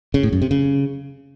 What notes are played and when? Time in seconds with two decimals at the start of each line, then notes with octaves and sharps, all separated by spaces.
0.14 C#3
0.23 A2
0.32 F#2
0.42 C3
0.51 C#3